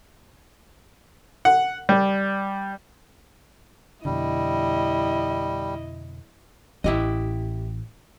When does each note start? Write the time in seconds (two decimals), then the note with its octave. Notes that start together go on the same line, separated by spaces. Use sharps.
1.45 F#5
1.89 G3
4.05 F2 B2 D3 G3 E4 D#5
6.84 A1 E4 G4 D#5